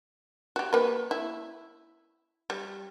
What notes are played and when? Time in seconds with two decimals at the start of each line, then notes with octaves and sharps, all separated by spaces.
0.56 F#4 G4
0.73 A#3 B4
1.11 E4
2.50 G3